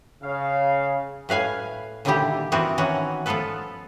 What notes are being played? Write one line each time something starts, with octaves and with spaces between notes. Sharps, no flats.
C#3 F5
A2 B4 F5 G#5
A#2 D3 D#3 G3 E4 G4
E3 B3 C4 F#4 A#4 B4
D#3 E3 C#4 F#4 F#5
F3 B3 F4 A4 B4